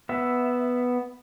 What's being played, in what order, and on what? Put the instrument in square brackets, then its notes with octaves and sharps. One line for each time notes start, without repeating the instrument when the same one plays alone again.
[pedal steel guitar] B3 E5